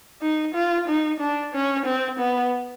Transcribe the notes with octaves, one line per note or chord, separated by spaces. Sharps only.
D#4
F4
D#4
D4
C#4
C4
B3